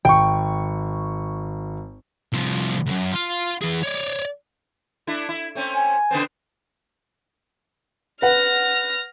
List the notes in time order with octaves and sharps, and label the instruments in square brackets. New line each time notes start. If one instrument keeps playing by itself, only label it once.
[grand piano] G#1 C#6 [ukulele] G5
[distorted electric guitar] C2 F3
C#2 F#2
F4 F5
E3 G#4
C#5 D5
[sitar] A3 D4 E4
E4
A3 C4 C#4
[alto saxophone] G#5
[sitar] C#3 B3 C4
[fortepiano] B4 F#5 [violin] F6 A#6